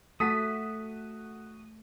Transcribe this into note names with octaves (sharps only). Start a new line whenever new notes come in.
A3 F#4 A4 D#6 B6 D#7